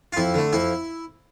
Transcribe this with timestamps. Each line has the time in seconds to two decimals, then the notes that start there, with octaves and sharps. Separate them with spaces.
0.13 F4
0.17 F2 E4
0.34 D3 A3
0.53 F2 E4